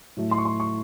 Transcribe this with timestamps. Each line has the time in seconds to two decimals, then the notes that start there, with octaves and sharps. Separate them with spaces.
0.17 A2 F#3 A3
0.31 C6
0.38 C#6
0.45 C6
0.60 C#6